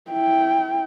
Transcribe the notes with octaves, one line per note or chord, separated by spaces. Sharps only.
E4 G5